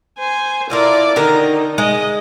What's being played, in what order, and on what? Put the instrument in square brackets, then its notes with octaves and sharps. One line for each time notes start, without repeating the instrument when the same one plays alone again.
[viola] C5 G#5
[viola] E4 D5 [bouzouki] F4 A4 A#4
[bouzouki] D3 D#3 A#4 [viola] D#4
[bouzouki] G#3 [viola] D#5